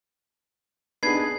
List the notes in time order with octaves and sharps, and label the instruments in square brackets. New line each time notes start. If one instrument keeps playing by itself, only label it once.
[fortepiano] B3 D#4 G#4 [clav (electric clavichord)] D4 B4 [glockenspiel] G#6 C7